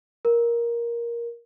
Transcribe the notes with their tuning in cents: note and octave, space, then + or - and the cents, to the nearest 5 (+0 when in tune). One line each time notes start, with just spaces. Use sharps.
A#4 +10